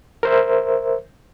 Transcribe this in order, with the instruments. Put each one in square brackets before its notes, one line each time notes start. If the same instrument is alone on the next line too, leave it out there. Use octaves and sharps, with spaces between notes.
[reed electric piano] A#4 C5 E5